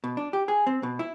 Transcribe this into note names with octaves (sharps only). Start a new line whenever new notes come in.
B2
D4
G4
G#4
C4
B2
E4